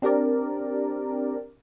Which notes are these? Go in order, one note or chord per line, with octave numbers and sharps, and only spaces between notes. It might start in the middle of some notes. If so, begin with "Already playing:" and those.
C4 D4 G4 A#4 D5